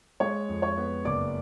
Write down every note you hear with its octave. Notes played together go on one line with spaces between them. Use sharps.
G#3 C#5 C#6
F2
C#5 C#6
B3
F#1 D5 D6